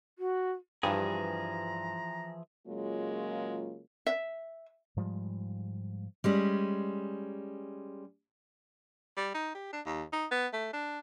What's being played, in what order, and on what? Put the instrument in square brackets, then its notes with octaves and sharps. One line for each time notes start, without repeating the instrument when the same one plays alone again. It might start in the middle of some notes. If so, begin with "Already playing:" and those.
[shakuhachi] F#4
[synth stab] G2 [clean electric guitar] E3 F3 G#4 [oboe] A#5
[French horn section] C#3 F#3 G#3 A#3 F4
[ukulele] E5
[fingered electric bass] G#2 F3 G3 G#3
[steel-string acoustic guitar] G3 G#3 C#4
[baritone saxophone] G3
D#4
G4
D4
D#2
D#4
B3
A3
D4